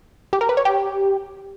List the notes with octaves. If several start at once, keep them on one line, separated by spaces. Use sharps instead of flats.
G4
A#4
B4
C#5
G4